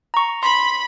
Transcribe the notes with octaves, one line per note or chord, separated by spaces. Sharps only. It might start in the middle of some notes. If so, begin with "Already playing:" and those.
A#5 C#6
B5 C6